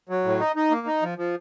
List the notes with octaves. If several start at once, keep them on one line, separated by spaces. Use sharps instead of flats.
F#3
A2
D#4
D#4
A#3
D#4
F3
F3